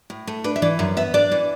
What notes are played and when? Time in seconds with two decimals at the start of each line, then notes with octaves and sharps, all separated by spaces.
0.10 A2
0.27 A3
0.44 D4 B4
0.56 E5
0.62 E3 D5
0.79 F#2 E5
0.97 B3 E5
1.14 D4 D5
1.32 E3